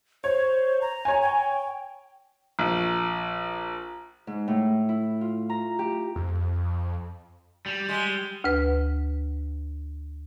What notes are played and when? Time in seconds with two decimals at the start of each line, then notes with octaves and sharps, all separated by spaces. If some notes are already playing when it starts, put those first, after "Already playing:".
0.24 C5 C#5
0.81 A#5
1.05 C#5 G#5
1.22 G5
2.59 A#1
4.27 G#2
4.48 A2
4.89 E4
5.21 F4
5.49 A#5
5.79 G4
6.16 F2
7.66 G3
7.89 G#3
8.44 D2 B4